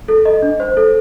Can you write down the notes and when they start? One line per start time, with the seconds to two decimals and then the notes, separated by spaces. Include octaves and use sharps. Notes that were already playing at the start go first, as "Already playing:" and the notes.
0.08 A4
0.25 D#5
0.42 D4
0.60 C5
0.77 A4